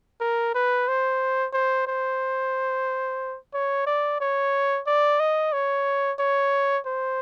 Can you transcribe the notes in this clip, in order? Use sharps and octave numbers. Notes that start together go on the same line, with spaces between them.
A#4
B4
C5
C5
C5
C#5
D5
C#5
D5
D#5
C#5
C#5
C5